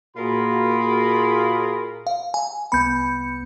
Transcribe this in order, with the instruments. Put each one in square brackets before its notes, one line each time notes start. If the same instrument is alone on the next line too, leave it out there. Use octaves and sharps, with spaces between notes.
[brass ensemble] A#2 F#4 G#4 [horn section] F4 A#4 B5
[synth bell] F5
G#5
[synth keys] C2 B3 C#7 [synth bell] B5 G6